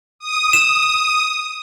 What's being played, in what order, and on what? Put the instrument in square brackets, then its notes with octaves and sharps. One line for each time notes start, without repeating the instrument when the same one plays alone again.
[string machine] D#6
[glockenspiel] E7